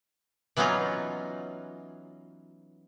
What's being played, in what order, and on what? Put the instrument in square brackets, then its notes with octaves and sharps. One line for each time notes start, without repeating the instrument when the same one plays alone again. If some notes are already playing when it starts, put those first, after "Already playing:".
[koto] E3 F#3 B3 C#4 D#4 F4